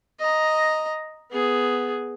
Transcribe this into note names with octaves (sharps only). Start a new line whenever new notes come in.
D#5 A#5
B3 G#4